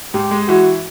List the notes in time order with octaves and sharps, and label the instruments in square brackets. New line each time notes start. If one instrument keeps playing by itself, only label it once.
[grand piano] G#2 [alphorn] G4
[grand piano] G#3
[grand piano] E3 [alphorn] F#4